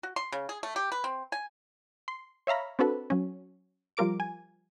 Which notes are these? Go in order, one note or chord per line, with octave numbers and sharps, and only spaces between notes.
F#4
C6
C#3
G#4
A3
G4
B4
C4
G#5
C6
C#5 E5 F5 A#5 B5
C4 D4 F#4 A4 B4
F#3 C#4
F3 G3 F4 A#4 D6 D7
G#5